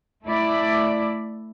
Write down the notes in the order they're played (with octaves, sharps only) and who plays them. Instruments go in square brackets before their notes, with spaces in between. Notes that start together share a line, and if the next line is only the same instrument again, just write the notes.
[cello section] A3 E4 D5